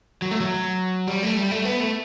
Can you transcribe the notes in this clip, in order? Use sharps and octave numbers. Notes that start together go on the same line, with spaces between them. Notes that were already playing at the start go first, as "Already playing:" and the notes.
F#3
A3
F#3
G3
A3
G3
A3
B3
A3